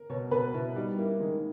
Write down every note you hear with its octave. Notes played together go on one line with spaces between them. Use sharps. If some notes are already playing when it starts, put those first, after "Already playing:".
Already playing: A#4
B2 C#5
B2 B4
B2 E4
G3 D#4
A#3 E4
D#3 G#3